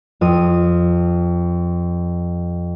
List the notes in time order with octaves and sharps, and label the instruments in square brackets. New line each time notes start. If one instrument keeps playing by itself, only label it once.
[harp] F2 D#6 D#7